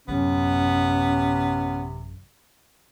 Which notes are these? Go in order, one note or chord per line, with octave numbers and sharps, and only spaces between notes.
A1 F#2 C3 B3 C#4